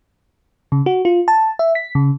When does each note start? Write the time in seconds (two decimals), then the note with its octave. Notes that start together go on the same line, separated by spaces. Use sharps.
0.72 C#3
0.86 F#4
1.05 F4
1.28 A5
1.59 E5
1.75 B6
1.95 C#3